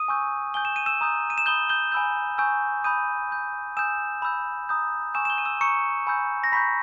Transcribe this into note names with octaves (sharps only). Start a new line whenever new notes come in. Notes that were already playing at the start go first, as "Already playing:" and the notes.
Already playing: D#6 D#7
G#5 C#6 E6 G6
G#5 D#6 G6 G7
E7
D#7
E6 E7
A#5 D#6 G6
D#7
E7
B5 D#6 G6 G7
G6 G7
G#5 B5 E6 G6
G#5 C#6 E6 G6
B5 D#6 G6 D#7
B5 G6
G#5 D#6 E6 G6 E7
B5 E6 G6
A#5 D#6 G6
G#5 C#6 E6 G6 E7
E7
G6 G7
D#7
E6 E7
A#5 C#6 E6 G6 C#7
G#5 B5 E6 G6
A#6
A#5 B5 C#6 G6 B6